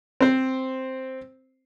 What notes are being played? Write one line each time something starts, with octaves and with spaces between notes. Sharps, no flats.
C4 C5